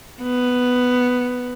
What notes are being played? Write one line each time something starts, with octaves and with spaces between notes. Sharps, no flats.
B3